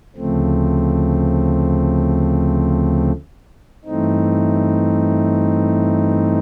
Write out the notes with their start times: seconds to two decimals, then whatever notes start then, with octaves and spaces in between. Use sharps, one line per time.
0.16 D2 C#3 F3 A3 C4
3.85 G2 E3 A3 C4 D#4